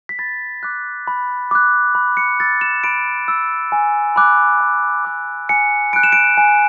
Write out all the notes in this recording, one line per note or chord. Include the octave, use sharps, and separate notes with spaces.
B6
B5 A6
D6 F#6
B5
D6 F#6
B5
C#7
E6 A6
E7
B5 D7
E6
G#5
B5 D6 F#6
G#5
B5 D6 F#6
G#5 C#7
B5 F#6 D7
E7
D7
G#5